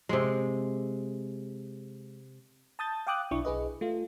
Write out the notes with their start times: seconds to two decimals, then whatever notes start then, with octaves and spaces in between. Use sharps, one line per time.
0.09 C3 G#3
2.79 A5 D#6 G6 A6
3.07 F5 G5 D6 D#6 F#6
3.31 B1 D4 E4 C#6
3.45 B1 G#4 B4 D#5
3.81 A3 F4